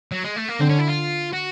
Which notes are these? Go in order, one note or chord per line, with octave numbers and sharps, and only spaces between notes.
F#3
G#3
A3
A#3
D3 C4
C#4
E4
F4
F#4